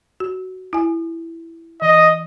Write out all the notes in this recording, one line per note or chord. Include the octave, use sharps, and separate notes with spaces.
F#4
E4 G#5
E3 D#5